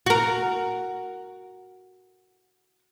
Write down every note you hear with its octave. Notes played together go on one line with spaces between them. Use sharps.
F#4 A#4